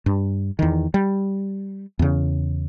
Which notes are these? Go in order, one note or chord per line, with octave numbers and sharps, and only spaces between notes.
G2
E2 D#3
G3
E2 C#3